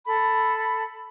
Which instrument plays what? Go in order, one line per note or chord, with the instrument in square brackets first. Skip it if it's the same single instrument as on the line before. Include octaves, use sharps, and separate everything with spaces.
[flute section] A4 B5